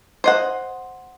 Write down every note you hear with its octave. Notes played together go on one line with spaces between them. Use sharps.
C5 D#5 F#5